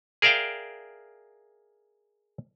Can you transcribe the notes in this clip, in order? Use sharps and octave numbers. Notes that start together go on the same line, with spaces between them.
G#4 A#4 D5 E5 F5 G5